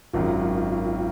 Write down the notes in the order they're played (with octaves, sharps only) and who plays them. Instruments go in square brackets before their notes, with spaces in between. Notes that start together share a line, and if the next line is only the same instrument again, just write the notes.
[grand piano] G#1 F#2 D#3 F#3 [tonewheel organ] F4
[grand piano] D#3